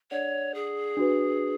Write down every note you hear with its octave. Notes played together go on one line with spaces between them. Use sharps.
D4 A4 C#5 D5 F#5
G#4
D4 F#4 B4